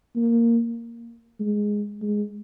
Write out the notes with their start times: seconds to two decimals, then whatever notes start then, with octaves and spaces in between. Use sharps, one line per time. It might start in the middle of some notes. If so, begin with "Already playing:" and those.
0.16 A#3
1.39 G#3
2.01 G#3